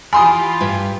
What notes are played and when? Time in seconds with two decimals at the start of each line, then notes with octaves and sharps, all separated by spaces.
0.13 E3 F4 G4 G#5 B5 C6 D#6
0.61 G2